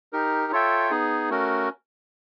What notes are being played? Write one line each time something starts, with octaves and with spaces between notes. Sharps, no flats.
D#4 G4 A#4
F4 A4 C#5 E5 G5
B3 D#4 G#4
A3 C#4 F#4 A#4